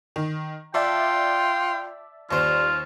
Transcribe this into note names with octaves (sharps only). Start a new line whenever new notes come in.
D#3
F4 D5 E5 G5 A5
D#2 G3 F4 C5